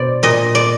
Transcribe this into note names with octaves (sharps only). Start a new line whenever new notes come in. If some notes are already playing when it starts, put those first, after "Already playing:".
Already playing: B2 C5 D5
A#2 D#5
D5